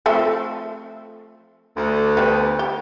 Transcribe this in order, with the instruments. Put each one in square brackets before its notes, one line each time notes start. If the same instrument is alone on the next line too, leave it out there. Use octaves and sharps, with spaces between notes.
[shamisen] F3 A3 C4
[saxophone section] D2
[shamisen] G3 B3
G4